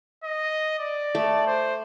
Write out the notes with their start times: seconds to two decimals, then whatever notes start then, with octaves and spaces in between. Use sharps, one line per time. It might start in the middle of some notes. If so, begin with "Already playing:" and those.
0.24 D#5
0.79 D5
1.15 A3
1.47 C5